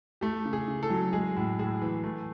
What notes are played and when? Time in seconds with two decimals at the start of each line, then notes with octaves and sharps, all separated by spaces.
0.21 A3 G4
0.45 C#3
0.53 G#4
0.68 C#3
0.83 A4
0.90 F#3
1.13 G#3 G#4
1.36 A2
1.59 A2 G#4
1.82 E3
2.04 A3